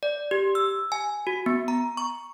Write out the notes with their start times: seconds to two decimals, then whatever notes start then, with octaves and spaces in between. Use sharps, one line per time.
0.03 D5
0.31 G4
0.55 E6
0.92 G#5
1.27 F#4
1.46 B3
1.68 A#5
1.97 C#6